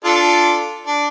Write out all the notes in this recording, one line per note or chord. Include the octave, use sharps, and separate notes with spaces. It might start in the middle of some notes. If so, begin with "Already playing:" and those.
D4 F4 A4
D4